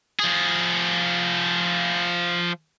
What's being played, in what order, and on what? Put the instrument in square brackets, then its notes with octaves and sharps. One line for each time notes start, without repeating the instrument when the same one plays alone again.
[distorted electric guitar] F3 G#4